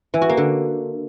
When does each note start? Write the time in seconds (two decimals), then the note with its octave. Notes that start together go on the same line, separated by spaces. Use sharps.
0.14 E3
0.22 F#4
0.29 A#3
0.37 D3